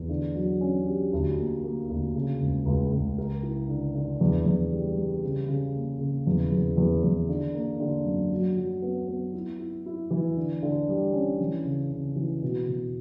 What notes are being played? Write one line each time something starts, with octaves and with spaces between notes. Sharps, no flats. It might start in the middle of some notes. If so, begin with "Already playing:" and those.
Already playing: E2
D3
F#3
C#4
G4
D2
A#3
A#3
D2
C#3
C#2
C#2
C#2
A#4
E4
D3
D3
E2
E2
G3
G3
C#3
C#3
A#3
C#3
E2
E2
E2
E2
D3
A#3
D3
F#2
F#3
F#3
B3
B3
E4
E4
E4
E3
D3
D3
G3
C#4
E3
C#3
C#3
E3
B2
B2